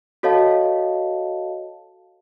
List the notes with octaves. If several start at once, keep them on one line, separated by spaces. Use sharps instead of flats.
F#4 A4 C#5 D#5 F5 A5